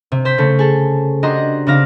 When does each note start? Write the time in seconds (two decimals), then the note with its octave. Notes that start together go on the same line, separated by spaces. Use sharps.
0.12 C3
0.25 C5 G6 B6
0.38 C#3 A3
0.59 G#4 A4
1.23 D4 F#4 G4 D#5 A#5 C6
1.67 C#3 C4 D4 F5 A#6